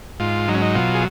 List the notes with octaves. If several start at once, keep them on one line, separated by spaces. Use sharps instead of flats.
G#2 F4
F#3 D#4
C#4
D#4
B2 F4
G#4